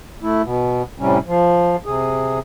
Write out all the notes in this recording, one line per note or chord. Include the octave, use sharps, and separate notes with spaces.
A3 E4
B2
A2 C3 G3 C#4
F3
C3 G#4